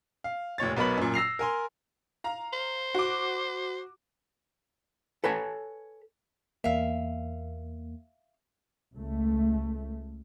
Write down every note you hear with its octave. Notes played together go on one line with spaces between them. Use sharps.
F5
F1 A#2 C#5 A6
B1 B3 A#4 C#5 B5 F#7
F#2 A#2
E6 A#6 C7 F7
A#4 G#5 C6
F5 A#5
C5
F#4 D6
A4 B4 C#5 G#5
E2 A#3 E5 F5
C#2 A3